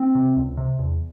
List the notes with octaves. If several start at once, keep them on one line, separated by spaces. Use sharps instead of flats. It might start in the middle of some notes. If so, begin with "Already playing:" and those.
Already playing: C4
C3
C#2
C3
E2